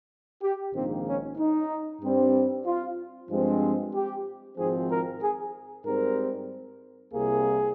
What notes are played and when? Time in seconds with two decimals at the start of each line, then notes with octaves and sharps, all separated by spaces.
0.42 G4
0.74 A#1 G#2 D#3 A#3 C4
1.06 C#4
1.37 D#4
2.02 G2 G3 C4
2.65 F4
3.30 G2 F3 G#3 C4
3.94 G4
4.57 G#1 G#2 F3 C4 G#4
4.90 A#4
5.21 G#4
5.85 G#2 G3 C4 A#4
7.13 C2 C3 G3 A#3 G#4